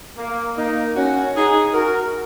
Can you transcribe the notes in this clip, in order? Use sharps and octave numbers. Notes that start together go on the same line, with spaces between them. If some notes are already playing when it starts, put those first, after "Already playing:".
A#3
A#3 D#4
C#4 F#4
D#4 G#4
F#4 A#4